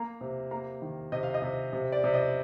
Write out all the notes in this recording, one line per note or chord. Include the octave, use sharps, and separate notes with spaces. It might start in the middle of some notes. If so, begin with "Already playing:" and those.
Already playing: A#3 A#5
C3
A#3 A#5
D#3
C3 D#5
F5
D#5
C3
C3
D5
C3
D#5